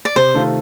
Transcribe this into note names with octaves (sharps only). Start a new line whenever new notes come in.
D5
C3 C5
D#3 A3 C4 F4